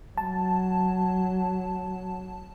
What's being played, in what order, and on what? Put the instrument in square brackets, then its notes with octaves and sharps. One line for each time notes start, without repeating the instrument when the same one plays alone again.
[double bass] F#3 [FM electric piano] A5